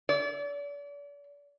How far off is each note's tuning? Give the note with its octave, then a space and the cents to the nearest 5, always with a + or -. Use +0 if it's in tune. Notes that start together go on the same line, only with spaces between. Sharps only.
D5 -40